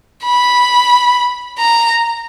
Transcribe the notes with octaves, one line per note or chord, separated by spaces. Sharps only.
B5
A#5